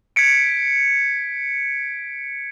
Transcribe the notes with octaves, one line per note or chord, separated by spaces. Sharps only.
G#6 B6 C#7 D7